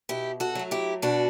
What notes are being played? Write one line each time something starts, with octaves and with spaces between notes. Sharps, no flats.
B2 E4 G4
F#4 A4
F#3 A3
E4 G4
B2 D4 F#4